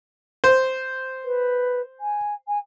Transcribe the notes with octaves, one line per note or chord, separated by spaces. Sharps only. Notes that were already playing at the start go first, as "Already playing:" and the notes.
C5
B4
G#5
G#5